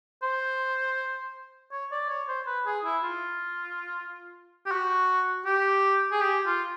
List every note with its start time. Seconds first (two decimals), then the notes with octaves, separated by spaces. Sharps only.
0.22 C5
1.72 C#5
1.91 D5
2.09 C#5
2.28 C5
2.47 B4
2.66 G#4
2.84 E4
3.03 F4
4.66 G4
4.71 F#4
5.46 G4
6.11 G#4
6.21 G4
6.46 F4